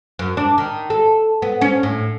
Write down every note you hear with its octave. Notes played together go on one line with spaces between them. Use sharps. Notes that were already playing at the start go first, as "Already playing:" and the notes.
F#2
D4
D#3
A4
B3
C#4
A2